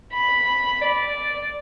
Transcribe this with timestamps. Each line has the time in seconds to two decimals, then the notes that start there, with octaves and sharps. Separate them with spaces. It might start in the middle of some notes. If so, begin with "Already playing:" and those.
0.13 B5
0.82 D5